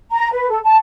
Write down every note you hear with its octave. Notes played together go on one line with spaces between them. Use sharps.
A#5
B4
A4
A5